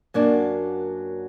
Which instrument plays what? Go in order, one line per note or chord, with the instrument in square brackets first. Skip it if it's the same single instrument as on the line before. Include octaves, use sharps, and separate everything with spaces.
[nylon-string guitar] F#2 F#3 A#3 D4